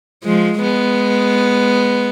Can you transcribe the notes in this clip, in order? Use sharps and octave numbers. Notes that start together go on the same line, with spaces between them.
F3 G#3
G#3 B3